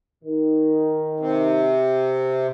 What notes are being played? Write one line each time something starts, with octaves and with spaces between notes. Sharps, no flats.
D#3
C3